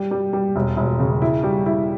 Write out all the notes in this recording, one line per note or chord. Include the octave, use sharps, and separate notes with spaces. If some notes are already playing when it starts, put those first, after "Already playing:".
Already playing: G3
G3
G3
E1
E1
C#3
E4
G3
E4